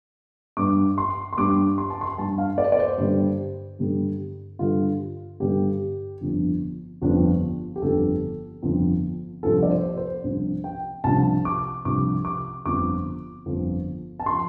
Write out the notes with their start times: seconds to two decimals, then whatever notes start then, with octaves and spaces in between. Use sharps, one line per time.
0.57 G2 G3 D4 D6
0.98 C6
1.33 C6
1.38 G2 G3 D4 D6
1.78 C6
1.90 A5
2.01 C6
2.18 G2 G3 D4 A5
2.38 F5
2.58 D5
2.72 D5
2.78 C5
2.98 G2 D3 G3
3.79 G2 D3 G3
4.59 G2 D3 G3 F4
5.40 G2 D3 G3 G4
6.21 G1 F2 F3 D4
7.02 G1 F2 F3 D4
7.76 G4
7.82 G1 F2 F3 D4 A4
8.62 G1 F2 F3 D4
9.43 C2 C3 F3 D4 A4
9.63 D5
9.70 C5
9.97 C5
10.24 C2 C3 F3 D4
10.64 G5
11.04 C2 C3 F3 D4 A5
11.45 D6
11.85 C2 C3 F3 D4 D6
12.25 D6
12.66 G1 F2 F3 D6
13.46 G1 F2 F3
14.20 A5
14.26 F3 C6